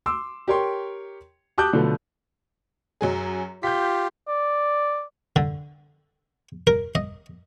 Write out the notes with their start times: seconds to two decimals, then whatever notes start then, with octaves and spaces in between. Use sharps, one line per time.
0.06 C6 D6 E6
0.48 G4 A#4 C#5 G5 C6
1.58 G4 A5 D6 D#6 F#6 G6
1.73 B2 D3 F3 F#3 A3 B3
3.01 F#2 F#3 G#4
3.63 F4 G4 G6 B6
4.28 D5
5.36 D3
6.67 A#4
6.95 D#5